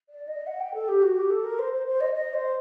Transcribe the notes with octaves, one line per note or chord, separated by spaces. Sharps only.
D5
D#5
F#5
G5
A4
G4
F#4
G4
A4
A#4
C5
C5
C5
D#5
D#5
C5